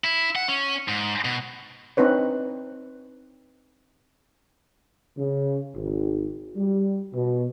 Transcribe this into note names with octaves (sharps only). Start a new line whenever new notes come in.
E4
F#5
C#4
G#2
B2
C4 D4 D#4 B4 C#5
C#3
G#1
G3
B2